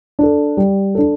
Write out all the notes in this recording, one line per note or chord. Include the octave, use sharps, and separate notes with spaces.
D4 A4
G3
D4 A4